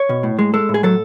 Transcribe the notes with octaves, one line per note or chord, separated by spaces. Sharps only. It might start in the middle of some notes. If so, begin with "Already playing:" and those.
Already playing: C#5
B2
A2
G#3
G#3 A4
A2
G#4
F#3 A4